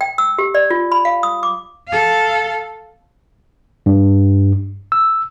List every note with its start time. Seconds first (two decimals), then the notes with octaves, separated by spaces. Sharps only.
0.01 G5
0.18 E6
0.38 G4
0.55 D5
0.70 F4
0.92 B5
1.05 F5
1.23 D#6
1.43 D6
1.88 A4 F5
3.86 G2
4.92 E6